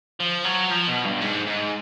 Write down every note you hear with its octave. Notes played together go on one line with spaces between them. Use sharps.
F3
F#3
F3
B2
G2
G#2
G#2